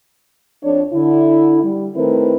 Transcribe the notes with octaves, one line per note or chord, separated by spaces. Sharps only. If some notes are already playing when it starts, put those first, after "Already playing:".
F2 D4 C#5
D3 E4
G3
D#3 A3 C4 E4 A#4 B4